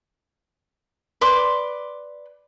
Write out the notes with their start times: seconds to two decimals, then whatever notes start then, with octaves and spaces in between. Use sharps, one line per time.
1.21 B4 D5 C6 D6